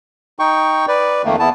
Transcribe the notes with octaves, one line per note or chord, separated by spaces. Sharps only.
D#4 G5 C#6
B4 D5
F2 D#3 A3 A#3
E2 B3 E4 A5